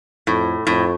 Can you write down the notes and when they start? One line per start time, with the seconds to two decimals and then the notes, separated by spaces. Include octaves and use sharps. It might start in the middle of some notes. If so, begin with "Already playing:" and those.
0.27 F2 A2
0.67 F2 A2